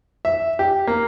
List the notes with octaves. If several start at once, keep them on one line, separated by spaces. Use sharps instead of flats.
E5
G4
A#3